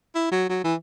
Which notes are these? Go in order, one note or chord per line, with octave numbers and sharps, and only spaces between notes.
E4
F#3
F#3
E3